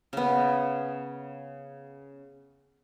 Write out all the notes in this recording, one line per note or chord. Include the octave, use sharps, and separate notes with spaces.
C#3 B3